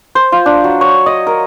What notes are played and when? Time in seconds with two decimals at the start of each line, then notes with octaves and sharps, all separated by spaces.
0.15 C5
0.32 F4
0.46 D4
0.64 F#3
0.81 C#5
1.06 D#5
1.27 A#4